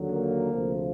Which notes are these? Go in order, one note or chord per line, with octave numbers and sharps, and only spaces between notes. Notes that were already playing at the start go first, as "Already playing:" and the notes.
Already playing: D#2 D3 F#3
A#3
D2 C3 F3